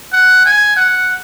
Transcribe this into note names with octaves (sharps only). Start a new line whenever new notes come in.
F#5
G#5
F#5